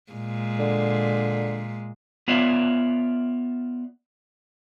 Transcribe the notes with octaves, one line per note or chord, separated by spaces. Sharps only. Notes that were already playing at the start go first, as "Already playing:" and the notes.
A#2 G#3
D3
B3 F4 C#5 D5 E5